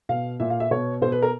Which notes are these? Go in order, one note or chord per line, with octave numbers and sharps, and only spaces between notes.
B2 F5
A#2 E5
F5
E5
B2 C#5
B2 C5
B4
A#4